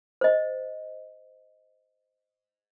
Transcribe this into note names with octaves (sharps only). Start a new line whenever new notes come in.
C5 D#5